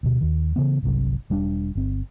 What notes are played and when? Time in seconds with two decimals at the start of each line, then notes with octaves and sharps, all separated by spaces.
0.03 D2 B2
0.21 D#2 D#3
0.56 C#3 E3 B3
0.82 G1 C2 C3 F#3
1.30 E1 G3 B3 D4
1.75 G1 C4